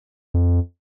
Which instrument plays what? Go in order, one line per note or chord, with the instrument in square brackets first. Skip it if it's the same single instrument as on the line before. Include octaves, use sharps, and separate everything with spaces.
[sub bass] F2